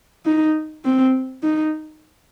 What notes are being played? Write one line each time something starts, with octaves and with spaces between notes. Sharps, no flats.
D#4
C4
D#4